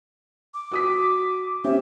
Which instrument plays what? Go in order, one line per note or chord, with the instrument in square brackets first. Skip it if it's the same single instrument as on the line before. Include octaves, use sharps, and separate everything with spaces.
[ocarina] D6
[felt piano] F#4 D#6 B6
[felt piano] C4 C#4 G4 [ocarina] E5